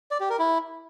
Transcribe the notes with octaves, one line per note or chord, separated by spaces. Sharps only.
D5
G4
A#4
E4